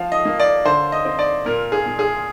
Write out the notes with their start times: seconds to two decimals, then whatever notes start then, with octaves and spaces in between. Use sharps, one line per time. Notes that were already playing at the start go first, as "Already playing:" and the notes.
Already playing: F3 F5
0.12 D#5
0.25 A#3
0.40 D5
0.65 D3 C5
0.92 D#5
1.05 C4
1.19 D5
1.46 A#2 A#4
1.72 G#4
1.86 A#2
1.99 G#4